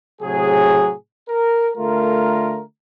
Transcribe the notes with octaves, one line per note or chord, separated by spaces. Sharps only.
A2 C3 F#3 G#4
A#4
D3 A3 F4 A#4